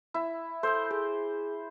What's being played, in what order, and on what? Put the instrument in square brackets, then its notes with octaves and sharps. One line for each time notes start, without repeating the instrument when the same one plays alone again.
[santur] E4
[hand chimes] A4 E6 G6 [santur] C5
[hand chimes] G#4